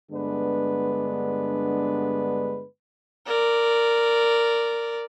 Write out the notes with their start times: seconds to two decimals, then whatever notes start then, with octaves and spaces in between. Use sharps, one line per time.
0.12 G2 D3 G#3 B3 D4 B4
3.26 A#4 D5